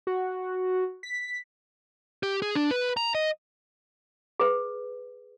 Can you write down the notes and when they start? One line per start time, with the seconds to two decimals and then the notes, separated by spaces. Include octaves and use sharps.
0.07 F#4
1.03 B6
2.23 G4
2.42 G#4
2.55 D4
2.71 B4
2.97 A#5
3.15 D#5
4.40 G#4 B4